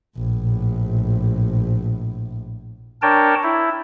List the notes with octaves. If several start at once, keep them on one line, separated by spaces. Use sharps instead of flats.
A#1 A2
D4 A#4 C#5 G5 A5
E4